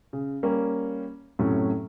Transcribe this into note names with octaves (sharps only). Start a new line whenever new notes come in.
C#3
G3 A#3 C#4
F#2 A2 C3 F#3 C#4